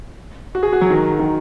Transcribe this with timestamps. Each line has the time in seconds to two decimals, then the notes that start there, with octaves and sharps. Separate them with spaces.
0.55 F#4
0.63 G#4
0.73 F#4
0.81 F#3
0.90 D#3
1.19 D#3